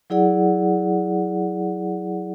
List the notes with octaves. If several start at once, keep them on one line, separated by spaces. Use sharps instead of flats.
F#3 E4 G#4 D5 F#5